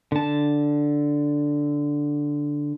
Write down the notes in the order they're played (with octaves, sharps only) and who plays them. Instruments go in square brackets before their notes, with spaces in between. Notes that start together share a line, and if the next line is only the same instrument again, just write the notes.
[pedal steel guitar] D3 A5